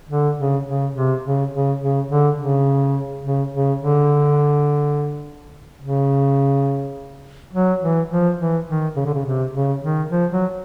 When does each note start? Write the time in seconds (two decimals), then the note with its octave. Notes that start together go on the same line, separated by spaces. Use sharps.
0.10 D3
0.38 C#3
0.67 C#3
0.95 C3
1.25 C#3
1.53 C#3
1.81 C#3
2.09 D3
2.38 C#3
3.24 C#3
3.53 C#3
3.81 D3
5.82 C#3
7.53 F#3
7.82 E3
8.10 F3
8.39 E3
8.68 D#3
8.96 C#3
9.06 D3
9.15 C#3
9.25 C3
9.54 C#3
9.82 D#3
10.10 F3
10.32 F#3